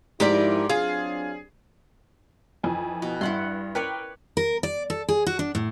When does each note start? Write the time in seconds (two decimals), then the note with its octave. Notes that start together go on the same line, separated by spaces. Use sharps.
0.20 G#2 F3 E4 G4 A#4 D5
0.70 F#3 C4 D4 F4 G#4
2.63 F2 E3 G#5
3.02 B2
3.21 G2 E4 F#5 C6
3.75 A#4 B4 C#5 D5 G5
4.37 A#4
4.63 D5
4.90 A4
5.09 G#4
5.27 F#4
5.39 D4
5.55 A2